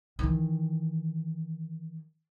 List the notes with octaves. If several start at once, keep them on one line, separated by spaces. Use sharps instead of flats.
D#3 E3